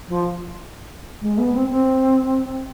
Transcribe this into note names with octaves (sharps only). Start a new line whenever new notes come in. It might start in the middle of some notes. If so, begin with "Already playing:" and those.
F3
G#3
B3
C4
C4